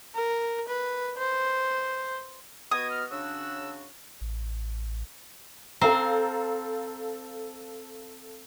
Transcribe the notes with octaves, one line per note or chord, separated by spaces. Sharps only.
A#4
B4
C5
B3 F#4 D#5 D#6 G#6
F6
C#3 D4 F#4 E6
A1
C4 A4 C5 F5 A#5